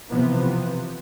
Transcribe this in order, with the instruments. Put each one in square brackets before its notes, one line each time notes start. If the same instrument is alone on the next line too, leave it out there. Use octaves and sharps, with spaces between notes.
[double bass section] C3 E3 F3 B3